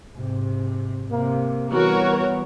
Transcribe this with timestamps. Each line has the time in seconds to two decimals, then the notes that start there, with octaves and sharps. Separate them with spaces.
0.12 G#2 C3
1.11 C3 A#3
1.71 E3 G3 B3 F#4 A#4 C#5